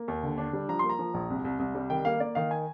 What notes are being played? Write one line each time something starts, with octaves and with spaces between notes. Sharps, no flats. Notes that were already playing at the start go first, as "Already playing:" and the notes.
Already playing: A#3
D#2
D3
D4
G3
F3 A#5
A#3 C6
A#5
F3
A#1
C2
C2
C2
G3
D#3 G5
A#3 F5
A#3 D5
D#3 F5
G#5